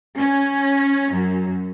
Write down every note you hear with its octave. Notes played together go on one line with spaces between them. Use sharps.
C#4
F#2